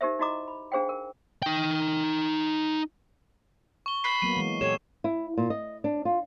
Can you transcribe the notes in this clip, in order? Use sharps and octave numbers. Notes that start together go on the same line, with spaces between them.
D#4 G4 A#4 C5 E5
D#4 E4 F#4 D#5 A#5 D6
B5
D4 G#4 C5 F5 G5
A#4
D#4 G5
C#6 G7
B5 C7
F#3 A#3 B3 D#7
E3 G#3
A#2 G4 A4 C#5 E7
E4
A#2
D#5
D4
F4